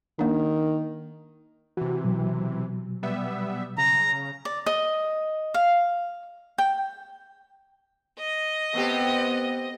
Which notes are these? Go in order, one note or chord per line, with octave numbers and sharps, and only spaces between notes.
D#3 A#3 D4
C3 E3 F#4
B2 F#3
G3 B3 E5
C#3 A#5
D5
D#5
F5
G5
D#5
A3 B3 C4 G4